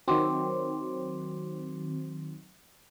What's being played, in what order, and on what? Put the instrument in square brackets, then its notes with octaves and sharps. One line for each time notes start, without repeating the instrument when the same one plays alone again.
[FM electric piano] D#3 F#3 C4 [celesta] F#4 C6 D6